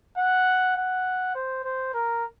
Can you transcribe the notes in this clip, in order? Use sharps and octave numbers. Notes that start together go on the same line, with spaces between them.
F#5
F#5
C5
C5
A#4